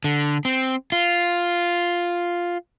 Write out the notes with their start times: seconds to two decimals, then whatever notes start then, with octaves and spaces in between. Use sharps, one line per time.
0.04 D3
0.45 C4
0.92 F4